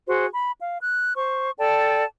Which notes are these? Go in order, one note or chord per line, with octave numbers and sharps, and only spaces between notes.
F#4 G#4 C5
B5
F5
F#6
C5 C#6
A4 D5 G5 A5